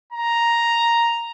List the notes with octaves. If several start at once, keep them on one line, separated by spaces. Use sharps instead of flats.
A#5